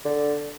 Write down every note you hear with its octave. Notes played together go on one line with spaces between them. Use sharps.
D3